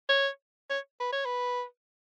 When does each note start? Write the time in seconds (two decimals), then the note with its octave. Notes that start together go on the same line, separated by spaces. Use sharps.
0.09 C#5
0.70 C#5
1.00 B4
1.12 C#5
1.25 B4